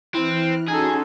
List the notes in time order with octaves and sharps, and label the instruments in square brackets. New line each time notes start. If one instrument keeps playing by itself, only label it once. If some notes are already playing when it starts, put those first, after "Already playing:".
[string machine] E3 F6 F#6 [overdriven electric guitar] C4 [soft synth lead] E4
[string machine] C#4 F#4 C6 [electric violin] D#4 A4 [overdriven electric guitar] G#4 [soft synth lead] G#6